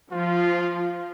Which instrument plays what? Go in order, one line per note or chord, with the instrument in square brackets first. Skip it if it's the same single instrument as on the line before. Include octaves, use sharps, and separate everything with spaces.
[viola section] F3 [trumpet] F4